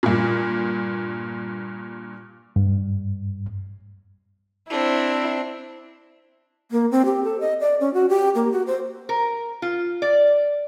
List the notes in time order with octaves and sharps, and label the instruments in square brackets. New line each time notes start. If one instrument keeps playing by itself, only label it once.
[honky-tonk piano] G2 A#2
[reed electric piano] G2
[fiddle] C4 D4 [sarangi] E4
[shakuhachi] A#3
C4
G4
A4
D#5
D5
C#4
F#4
G4
A#3
F#4
C5
[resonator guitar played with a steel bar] A#4
F4
D5